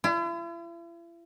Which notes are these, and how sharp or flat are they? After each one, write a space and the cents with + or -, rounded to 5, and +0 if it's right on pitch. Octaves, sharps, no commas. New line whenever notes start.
E4 +45